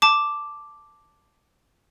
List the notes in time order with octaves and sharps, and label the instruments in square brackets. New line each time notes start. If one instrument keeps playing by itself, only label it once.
[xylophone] A5 D6